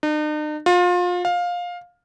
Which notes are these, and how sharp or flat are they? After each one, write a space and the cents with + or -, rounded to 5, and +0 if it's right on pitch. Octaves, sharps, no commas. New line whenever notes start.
D#4 -45
F4 +30
F5 +15